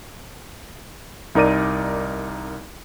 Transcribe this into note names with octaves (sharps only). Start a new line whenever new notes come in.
C2 D#4 A#4 D5 D#7